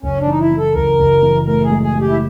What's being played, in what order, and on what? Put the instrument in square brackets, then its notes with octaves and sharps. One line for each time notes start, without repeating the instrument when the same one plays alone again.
[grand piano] F#1 [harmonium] C#4
[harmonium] D4
[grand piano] E3 [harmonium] D#4
[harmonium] E4
[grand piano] E3
[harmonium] A4
[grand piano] F#1 [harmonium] A#4
[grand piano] F#1
E3
[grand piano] A2 [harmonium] A#4
[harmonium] G#4
[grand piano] G#3
[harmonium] G#4
[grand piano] G#3
[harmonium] G4
E4